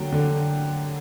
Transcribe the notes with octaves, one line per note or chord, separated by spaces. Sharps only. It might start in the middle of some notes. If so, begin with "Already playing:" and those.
Already playing: D3 F#3 A#3 G5
D3